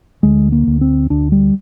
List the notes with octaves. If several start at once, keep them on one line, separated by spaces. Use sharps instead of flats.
D2 G#3
A#3
D2
C4
D2 D4
G3